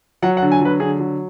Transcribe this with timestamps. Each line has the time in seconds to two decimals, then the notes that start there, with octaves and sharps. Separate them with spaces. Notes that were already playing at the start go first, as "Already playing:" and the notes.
0.22 F#3 F#5
0.37 F#5
0.42 D3
0.52 G#5
0.61 F#3 B4
0.80 D3 G#4
1.00 F#3